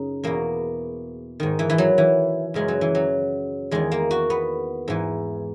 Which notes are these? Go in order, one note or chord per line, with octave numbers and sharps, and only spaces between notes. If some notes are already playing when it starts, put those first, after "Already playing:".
Already playing: F#2 C#3 D#4
E2 B2 A#3
G#2 D#3
E3
E3
F#3
E3
F#2 C#3 E3 G#3
F#3
E3
F#3
E2 D#3 G#3
A#3
F#4
B3
G#2 E3